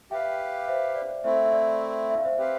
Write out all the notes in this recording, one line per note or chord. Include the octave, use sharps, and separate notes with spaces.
G4 B4 E5 F5 G5
C5 E5
D5
A3 C4 E4 C5 E5
E5
D5
E5
F5
C5 E5
C4 G4 B4 F5